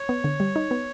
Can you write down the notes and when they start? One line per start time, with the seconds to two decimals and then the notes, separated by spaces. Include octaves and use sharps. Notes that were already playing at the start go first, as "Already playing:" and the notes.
Already playing: C#5
0.09 B3
0.24 D3
0.40 G3
0.56 D#4
0.71 B3